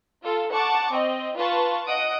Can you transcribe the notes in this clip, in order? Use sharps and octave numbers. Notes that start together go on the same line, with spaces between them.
F4 A4
F#5 A5 C#6 D6 C#7
C4 D#5
F4 B4 A5 C#6
D#5 F#5 D#6 D7